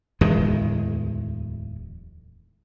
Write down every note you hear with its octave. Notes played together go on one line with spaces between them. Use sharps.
D1 E2 D#3 G#3